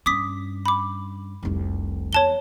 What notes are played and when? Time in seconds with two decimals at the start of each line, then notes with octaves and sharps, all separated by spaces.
0.06 G2 C#4 D6 D#6 B6
0.66 B5 D6
1.43 F1 C2
2.13 E2 C#5 A5 G7